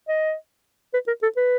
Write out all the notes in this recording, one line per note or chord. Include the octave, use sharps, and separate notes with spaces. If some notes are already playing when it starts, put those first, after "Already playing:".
D#5
B4
A#4
A4
B4